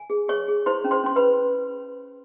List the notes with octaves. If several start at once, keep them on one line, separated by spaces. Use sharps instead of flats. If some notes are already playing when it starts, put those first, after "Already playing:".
Already playing: G#5
G#4
G#4 C#5 C#6
G#4
E4 C5 C6
C#4
C5 C6
C#4 C6
B4 B5